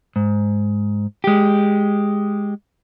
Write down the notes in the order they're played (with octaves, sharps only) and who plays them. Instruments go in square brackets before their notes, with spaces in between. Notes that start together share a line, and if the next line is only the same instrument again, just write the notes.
[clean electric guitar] G#2
G#3 G4